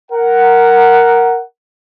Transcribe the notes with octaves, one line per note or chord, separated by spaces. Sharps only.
A#4 F#5